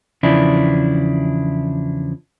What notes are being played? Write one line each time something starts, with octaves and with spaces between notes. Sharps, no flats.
E2 C#3 F3 D4 E4